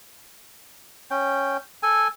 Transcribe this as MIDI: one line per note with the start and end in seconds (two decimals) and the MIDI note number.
1.11 1.57 61
1.11 1.57 79
1.83 2.08 69
1.83 2.08 80